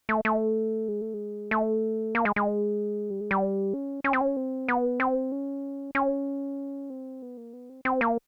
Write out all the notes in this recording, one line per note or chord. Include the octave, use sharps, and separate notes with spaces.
A3
A3
G#3
A3
G#3
A3
A#3
G#3
G#3
G3
G#3
G3
C#4
C#4
C4
C#4
C4
B3
C4
C#4
C#4
C4
B3
A#3
B3
C4
C4
A#3